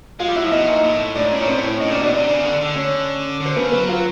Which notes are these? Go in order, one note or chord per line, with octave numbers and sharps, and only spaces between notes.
G#3 F4 F5
G3
F#3 E4 E5
F3
B2 D#4 D#5
A#2
A2
A2 D4 D5
G#2
A2 C#4 C#5
A#2
A2 C4 C5
C#4 C#5
A2 D#4 D#5
A#2 D4 D5
B2 D4 D5
C3 D4 D5
C#3
D3
D3
C#4 C#5
D3
C5
C#3 B3 B4
F#3 B3 B4
F4